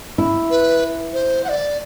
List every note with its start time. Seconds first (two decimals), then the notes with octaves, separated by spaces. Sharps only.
0.18 E4
0.50 B4
1.13 C5
1.44 F#5
1.49 D5